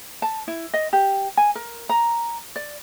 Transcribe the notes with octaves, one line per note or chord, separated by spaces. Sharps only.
A5
E4
D#5
G4
G#5
A#4
A#5
D5